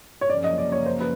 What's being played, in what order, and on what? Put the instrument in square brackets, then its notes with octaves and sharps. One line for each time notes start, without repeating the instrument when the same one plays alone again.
[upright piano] C#5
[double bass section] F#2 C#3 F3 A#3 C#4 [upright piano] D5
[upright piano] D#5
D5
C#5
C5
B4